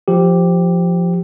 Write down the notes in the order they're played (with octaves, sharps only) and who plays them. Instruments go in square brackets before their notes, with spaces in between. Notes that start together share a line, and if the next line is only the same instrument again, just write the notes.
[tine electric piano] F3 G4